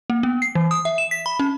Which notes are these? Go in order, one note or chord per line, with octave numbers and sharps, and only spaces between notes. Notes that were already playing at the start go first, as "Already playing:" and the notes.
A#3
B3
C7
E3
D#6
E5
E7
B6
B5
C#4